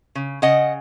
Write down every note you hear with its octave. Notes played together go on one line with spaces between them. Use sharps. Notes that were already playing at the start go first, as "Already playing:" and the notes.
C#3
C#3 D#5 F#5